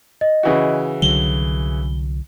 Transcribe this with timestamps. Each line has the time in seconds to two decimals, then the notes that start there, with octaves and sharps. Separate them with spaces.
0.21 D#5
0.43 C#3 E3 F#4
1.02 C2 D3 F#3 G7